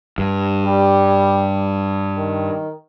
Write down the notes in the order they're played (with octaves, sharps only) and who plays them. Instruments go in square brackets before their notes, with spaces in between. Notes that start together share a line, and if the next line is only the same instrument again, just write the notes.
[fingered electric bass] G2
[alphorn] G3
D#3